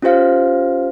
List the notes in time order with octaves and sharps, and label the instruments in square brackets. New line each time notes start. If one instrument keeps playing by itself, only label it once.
[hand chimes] C#4 F4 G4 C5 F5